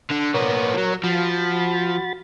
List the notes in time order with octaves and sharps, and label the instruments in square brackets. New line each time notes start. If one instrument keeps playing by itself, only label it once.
[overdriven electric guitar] D3
[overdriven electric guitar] A#2 B3 [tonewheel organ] A#4 C#5
[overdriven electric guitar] F3 F#3
[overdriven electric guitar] F3 [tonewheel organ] F#4 B5 A6